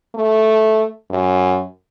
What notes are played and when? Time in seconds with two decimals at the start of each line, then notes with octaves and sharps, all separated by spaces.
0.15 A3
1.10 F#2